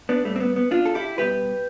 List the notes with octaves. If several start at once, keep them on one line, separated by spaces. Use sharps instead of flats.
B3 D4
A2 G3 A3
C4
B3
B3
D4 F4
A4
E4 G4
B2 G3 G4 B4